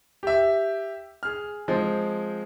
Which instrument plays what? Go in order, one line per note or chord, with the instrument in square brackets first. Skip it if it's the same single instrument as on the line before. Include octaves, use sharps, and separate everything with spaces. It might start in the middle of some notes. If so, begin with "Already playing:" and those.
[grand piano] G4 E5
G#4 F6
F3 G#3 C4